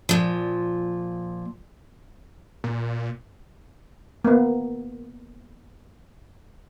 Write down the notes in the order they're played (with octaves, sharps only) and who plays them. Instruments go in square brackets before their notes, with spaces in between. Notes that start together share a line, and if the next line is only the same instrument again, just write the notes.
[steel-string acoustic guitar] A#2 F3
[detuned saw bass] A#2
[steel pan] A#3 B3